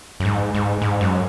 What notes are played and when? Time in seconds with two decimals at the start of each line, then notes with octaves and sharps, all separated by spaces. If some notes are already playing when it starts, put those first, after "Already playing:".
0.20 F#2
0.25 G#2
0.54 G#2
0.82 G#2
1.01 F#2